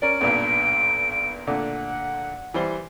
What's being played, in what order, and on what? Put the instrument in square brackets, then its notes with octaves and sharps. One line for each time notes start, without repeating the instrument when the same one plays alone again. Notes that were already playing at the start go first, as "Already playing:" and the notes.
[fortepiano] C#4 A#4 D5 [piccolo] D7
[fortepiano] B1 G2 A#2
[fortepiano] A#2 D3 A3 [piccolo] F#5
[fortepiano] E3 G3 C5